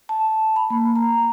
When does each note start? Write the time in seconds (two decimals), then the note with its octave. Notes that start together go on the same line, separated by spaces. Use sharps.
0.09 A5
0.56 B5
0.70 A#3
0.96 A#5